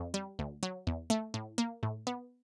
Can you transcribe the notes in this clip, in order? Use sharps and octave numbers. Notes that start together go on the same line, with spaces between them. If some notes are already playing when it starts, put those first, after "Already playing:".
Already playing: F2
G3
D2
F#3
E2
A3
A2
A#3
A2
B3